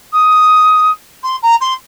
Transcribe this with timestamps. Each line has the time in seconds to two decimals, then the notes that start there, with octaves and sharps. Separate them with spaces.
0.13 D#6
1.23 C6
1.43 A#5
1.61 C6